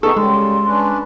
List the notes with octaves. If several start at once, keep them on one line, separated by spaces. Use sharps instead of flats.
B3 D#4 G#4 A4 C#6
C#3 G3 G#3 C6
C#4 D4 B4